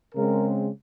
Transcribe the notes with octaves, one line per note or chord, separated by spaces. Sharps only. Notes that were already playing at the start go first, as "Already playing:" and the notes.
C#3 G#3 C4 A#4